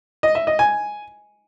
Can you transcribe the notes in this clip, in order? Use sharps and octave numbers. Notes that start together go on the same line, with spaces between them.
D#5
E5
D#5
G#5